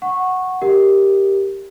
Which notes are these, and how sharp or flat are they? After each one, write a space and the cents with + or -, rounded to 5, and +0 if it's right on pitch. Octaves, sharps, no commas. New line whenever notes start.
F#5 +0 C#6 -10
G4 +0 A#4 +0 D#5 +25